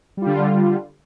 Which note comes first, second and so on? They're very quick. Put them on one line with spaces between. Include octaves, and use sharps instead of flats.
G3 F4 D3